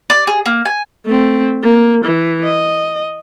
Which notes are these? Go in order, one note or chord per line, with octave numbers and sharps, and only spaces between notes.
D5
G#4
A#3
G#5
A3 C4
A#3
E3
D#5